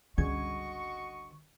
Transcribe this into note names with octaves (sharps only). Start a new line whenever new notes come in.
G1 C#2 D3 F#4 D#5 C#6 G#6